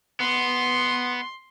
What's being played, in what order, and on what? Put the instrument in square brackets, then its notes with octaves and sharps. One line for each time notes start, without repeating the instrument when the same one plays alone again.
[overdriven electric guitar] B3 [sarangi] C6